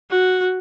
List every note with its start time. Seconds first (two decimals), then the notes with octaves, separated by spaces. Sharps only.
0.10 F#4